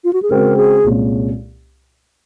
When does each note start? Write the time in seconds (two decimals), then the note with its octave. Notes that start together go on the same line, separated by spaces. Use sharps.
0.04 F4
0.13 F#4
0.22 G#4
0.30 C#3 G#3 C4 F#4 A#4 C5
0.57 G#4
0.84 C2 A#2 G#3 C#4